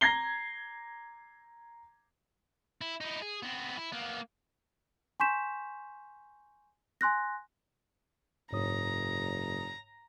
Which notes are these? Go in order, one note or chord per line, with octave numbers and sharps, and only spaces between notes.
A#5 G#6 A#6 C7 G7
E4
D#4 E4
G#4
B3 C4
E4
A#3 B3
G#5 C6 C#6 G6 B6 E7
G#5 C6 F#6 A#6
F#1 G#2 C#5 A#5 D#6